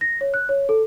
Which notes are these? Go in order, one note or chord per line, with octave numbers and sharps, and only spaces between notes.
A#6
C#5
F#6
C#5
A4